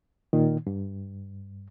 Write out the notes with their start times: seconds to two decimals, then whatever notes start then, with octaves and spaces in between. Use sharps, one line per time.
0.33 A#2 D#3
0.67 G2